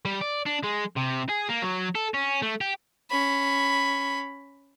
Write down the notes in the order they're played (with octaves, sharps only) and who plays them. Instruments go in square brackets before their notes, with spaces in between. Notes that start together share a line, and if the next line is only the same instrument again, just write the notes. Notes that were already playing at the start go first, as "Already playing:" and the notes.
[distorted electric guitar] G3
D5
D4
G#3
C3
G#4
A#3
F#3
A4
C#4
A3
G4
[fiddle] C#4 B5